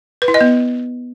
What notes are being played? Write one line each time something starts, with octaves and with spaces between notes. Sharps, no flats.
B4
E4
D#5
B3